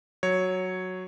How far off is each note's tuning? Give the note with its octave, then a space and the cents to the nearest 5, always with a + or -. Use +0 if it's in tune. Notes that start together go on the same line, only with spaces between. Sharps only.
F#3 +0 C#5 +0